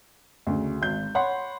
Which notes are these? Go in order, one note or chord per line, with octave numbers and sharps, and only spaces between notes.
D2 C#3
G#1 G6
C#5 F#5 B5 C6